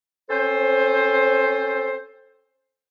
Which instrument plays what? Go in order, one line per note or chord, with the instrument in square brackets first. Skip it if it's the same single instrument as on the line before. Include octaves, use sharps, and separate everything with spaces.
[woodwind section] C4 C#4 A4 C5